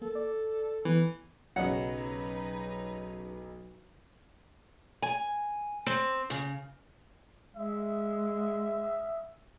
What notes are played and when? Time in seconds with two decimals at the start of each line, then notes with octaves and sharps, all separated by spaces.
0.02 A#3 A4
0.15 D5
0.85 E3 B3
1.56 B1 C#3 F#3 D#4 B4 D#5 F#5
5.02 G#5
5.86 C4
6.30 C#3
7.56 G#3 E5